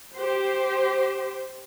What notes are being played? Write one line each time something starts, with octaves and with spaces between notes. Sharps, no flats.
G4 C5